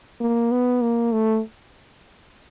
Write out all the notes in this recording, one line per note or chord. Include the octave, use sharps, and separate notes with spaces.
A#3
B3
A#3
A3